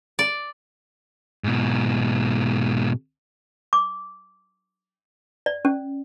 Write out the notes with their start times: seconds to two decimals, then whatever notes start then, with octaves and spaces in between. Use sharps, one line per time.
0.19 D5
1.44 G#2 B2
3.73 D6
5.46 D5
5.65 C#4